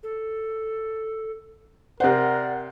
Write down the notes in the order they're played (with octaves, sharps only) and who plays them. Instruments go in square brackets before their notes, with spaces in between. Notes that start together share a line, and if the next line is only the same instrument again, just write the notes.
[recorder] A4
[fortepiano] C3 C5 [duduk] A#4 [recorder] D5 [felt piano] F#5 F#6